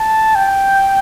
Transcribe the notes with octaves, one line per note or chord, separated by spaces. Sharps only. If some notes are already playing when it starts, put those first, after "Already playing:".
Already playing: A5
G5